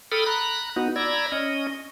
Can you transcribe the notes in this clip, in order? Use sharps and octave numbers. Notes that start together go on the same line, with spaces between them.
A4 G5 B5 D#6 F6
A#5 B5 F#6
B3 D#4 F#4
D5 A#5 B5 E6 G#6 A#6
C#4 D#5